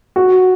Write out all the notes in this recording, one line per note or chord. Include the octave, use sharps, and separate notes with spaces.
F#4